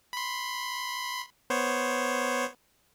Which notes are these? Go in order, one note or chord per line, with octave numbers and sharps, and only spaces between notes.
B5 C6
B3 C5 C#5